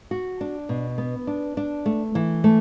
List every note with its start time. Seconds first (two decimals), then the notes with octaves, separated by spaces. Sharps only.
0.11 F#4
0.41 D4
0.69 B2
0.98 B3
1.27 D4
1.57 D4
1.86 A3
2.15 E3
2.44 A3